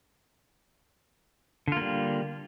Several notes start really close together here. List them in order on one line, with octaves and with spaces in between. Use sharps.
D3 F4 A#3 G3